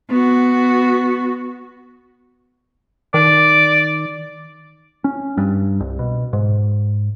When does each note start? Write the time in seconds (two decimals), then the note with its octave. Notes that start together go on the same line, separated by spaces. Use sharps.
0.10 B3 F#4
3.14 D#3 D5
5.04 C#4
5.38 G2
5.80 C2
5.99 B2
6.33 G#2